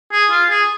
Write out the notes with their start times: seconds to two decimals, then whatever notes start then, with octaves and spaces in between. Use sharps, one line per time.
0.12 G#4
0.31 F4
0.50 G#4